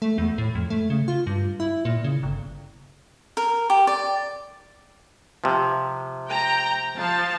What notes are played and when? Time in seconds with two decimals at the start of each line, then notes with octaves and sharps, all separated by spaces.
0.02 A3
0.18 E2
0.38 A2
0.55 F2
0.70 A3
0.90 C#3
1.08 F4
1.27 G2
1.60 E4
1.85 A#2
2.04 C#3
2.23 G1
3.37 A#4
3.70 G4
3.87 D5
5.44 C3 F3
6.29 G5 A#5
6.96 F3 F5 A5